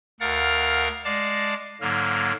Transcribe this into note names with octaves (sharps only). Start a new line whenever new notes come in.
D2 A#4 F5 F#5 A#5 A6
G#3 D5 F5 A5 D6 A#6
G#2 D3 F#3 A#3 F6